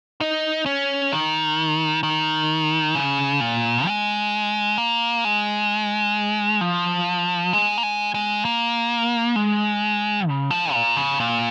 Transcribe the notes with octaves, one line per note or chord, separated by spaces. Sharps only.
D#4
C#4
D#3
D#3
C#3
A#2
G#3
A#3
G#3
F3
G#3
A#3
G#3
G#3
A#3
G#3
C#3
F3
A#2
C#3
A#2